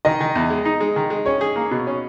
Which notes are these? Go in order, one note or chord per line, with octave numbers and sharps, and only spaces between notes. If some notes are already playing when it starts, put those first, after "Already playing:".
D#3 D#5
D#3
E2
G#3
D#4
G#3
D#3
G#3
C#4 C#5
G#4
A#3
B2
C#4